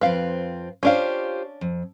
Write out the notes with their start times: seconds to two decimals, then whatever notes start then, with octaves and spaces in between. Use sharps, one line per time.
0.01 F2 C4 F4 B4 F5
0.83 C#4 D4 F4 G4 C5 F5
1.61 F2